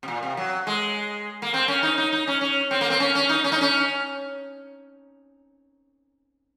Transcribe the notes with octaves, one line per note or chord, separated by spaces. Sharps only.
C3
A#2
C3
F#3
G#3
A#3
C4
C#4
D#4
D#4
D#4
C#4
C#4
C4
A#3
C4
C#4
C#4
D#4
C#4
D#4
C#4